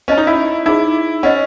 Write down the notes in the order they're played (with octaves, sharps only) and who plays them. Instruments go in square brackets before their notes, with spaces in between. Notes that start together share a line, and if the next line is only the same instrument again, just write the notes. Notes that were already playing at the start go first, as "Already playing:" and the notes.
[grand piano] C#4 [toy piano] C5 D#5 A5
[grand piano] D#4
E4
[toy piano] D#4 G#4 C5 [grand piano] E4
[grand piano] C#4 [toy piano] C5 D#5 F#5